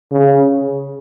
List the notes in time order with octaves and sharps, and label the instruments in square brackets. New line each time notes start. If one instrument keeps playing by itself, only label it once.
[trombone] C#3